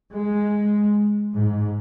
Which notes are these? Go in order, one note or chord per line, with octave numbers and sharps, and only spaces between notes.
G#3
G#2